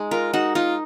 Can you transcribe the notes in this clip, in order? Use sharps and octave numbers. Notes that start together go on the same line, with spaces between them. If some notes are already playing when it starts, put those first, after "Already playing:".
Already playing: G#3 D#4
F4 A#4
D#4 F#4
D#4 F4